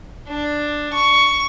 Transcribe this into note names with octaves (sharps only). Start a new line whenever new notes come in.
D4
C#6